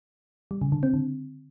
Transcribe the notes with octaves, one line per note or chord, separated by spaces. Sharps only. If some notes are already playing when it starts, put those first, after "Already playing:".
G3
C#3
D3
C4
D3